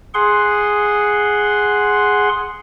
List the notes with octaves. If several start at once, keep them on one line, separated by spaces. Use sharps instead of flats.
G#4 F#5 C6